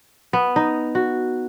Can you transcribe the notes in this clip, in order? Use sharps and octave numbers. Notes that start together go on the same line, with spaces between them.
B3
D#4
F#4